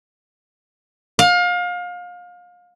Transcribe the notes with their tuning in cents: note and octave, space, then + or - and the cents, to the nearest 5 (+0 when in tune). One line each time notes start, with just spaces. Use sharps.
F5 +30